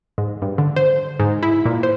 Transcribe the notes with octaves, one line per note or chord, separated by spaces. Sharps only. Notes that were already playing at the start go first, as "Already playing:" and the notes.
G#2
G2
D3
C5
G#2
E4
A#2
C5